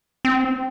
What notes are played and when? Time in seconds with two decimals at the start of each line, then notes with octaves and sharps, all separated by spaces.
0.25 C4